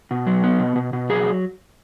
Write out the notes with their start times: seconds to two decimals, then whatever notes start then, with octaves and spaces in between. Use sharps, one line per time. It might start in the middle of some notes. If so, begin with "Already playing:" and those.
0.11 B2
0.27 F#3
0.44 B3
0.59 B2
0.76 B2
0.93 B2
1.09 F#3 G#4